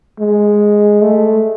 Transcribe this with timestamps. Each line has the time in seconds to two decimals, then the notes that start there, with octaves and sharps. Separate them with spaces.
0.20 G#3
1.02 A3